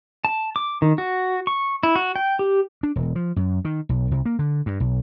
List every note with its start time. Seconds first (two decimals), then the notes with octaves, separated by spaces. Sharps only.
0.25 A5
0.56 D6
0.82 D#3
0.98 F#4
1.47 C#6
1.83 E4
1.96 F#4
2.16 G5
2.39 G4
2.83 D4
2.96 E1
3.16 F3
3.36 F#2
3.65 D#3
3.89 B1
4.11 C2
4.26 A#3
4.39 D3
4.66 G2
4.80 B1